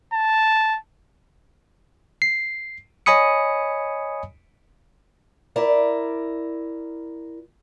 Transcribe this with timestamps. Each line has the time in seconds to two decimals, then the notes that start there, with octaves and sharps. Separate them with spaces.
0.13 A5
2.22 C7
3.06 C#5 D#5 G#5 B5 D#6 C#7
5.56 E4 A#4 D5